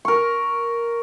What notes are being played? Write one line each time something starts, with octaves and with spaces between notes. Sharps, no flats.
A#4 C#6